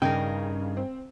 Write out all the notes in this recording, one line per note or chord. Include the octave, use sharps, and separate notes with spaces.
G2 C#3 D#4 G#4 A#4 G5
C4